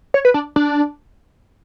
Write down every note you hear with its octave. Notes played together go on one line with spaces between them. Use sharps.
C#5
B4
D4
D4